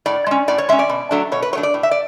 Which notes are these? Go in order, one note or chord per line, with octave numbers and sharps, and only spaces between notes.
A2 D5
G#3 C#4
A2 D5
C#5
G#3 C#4 E5
D5
B2
F#3 A3 D4
B2 C#5
B4
F#3 A3 D4 C#5
D5
A2
E5
D5